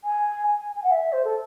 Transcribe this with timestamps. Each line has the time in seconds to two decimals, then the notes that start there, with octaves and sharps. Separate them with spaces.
0.04 G#5
0.48 G#5
0.76 G#5
0.84 F#5
0.91 E5
1.13 C5
1.25 A4